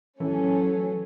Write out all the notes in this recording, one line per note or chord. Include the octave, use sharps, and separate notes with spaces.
A1 E3 F#3 A3 C#4 A4